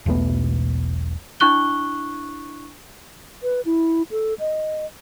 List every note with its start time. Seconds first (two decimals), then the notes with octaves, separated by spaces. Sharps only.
0.06 E1 B1 A3 B3
1.40 D4 E4 C#6 F#6 G7
3.43 B4
3.65 E4
4.11 A4
4.39 D#5